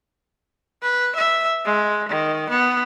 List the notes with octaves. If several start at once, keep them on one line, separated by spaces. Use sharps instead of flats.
B4
E5
G#3
D#3
B3